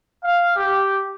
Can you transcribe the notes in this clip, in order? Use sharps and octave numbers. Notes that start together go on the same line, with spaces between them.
F5
G4